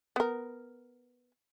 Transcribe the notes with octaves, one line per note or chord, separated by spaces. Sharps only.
B3 A#4